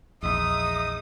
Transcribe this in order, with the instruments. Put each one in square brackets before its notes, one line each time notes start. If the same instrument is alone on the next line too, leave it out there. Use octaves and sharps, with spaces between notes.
[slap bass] A#1 E2 [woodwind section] G#3 D#4 E5 [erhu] D#6